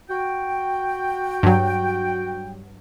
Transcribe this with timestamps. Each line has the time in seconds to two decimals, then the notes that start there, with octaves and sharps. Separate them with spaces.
0.10 F#4 G5
1.43 G2 F#3